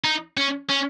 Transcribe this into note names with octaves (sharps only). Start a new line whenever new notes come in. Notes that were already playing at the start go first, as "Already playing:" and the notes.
D#4
C#4
C#4